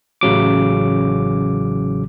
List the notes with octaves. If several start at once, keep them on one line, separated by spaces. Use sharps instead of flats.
A1 C#3 F#3 D6